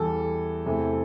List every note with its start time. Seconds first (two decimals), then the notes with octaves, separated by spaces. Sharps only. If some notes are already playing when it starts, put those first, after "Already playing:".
Already playing: E2 E3 G3 A4
0.66 E2 C3 E3 A3